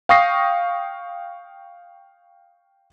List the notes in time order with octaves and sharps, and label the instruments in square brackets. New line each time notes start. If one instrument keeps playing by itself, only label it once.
[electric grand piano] F5 G5 C#6 D#6 A#6 C7